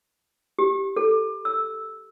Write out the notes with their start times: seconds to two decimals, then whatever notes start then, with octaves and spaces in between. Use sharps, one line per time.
0.59 G4
0.96 A4
1.45 E6